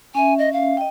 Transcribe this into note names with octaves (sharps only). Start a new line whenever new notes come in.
C#4 E5 G#5
D#5
F5
D#5 G5